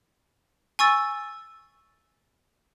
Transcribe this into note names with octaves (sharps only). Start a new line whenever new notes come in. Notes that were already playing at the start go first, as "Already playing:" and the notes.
G#5 C#6 E6 A6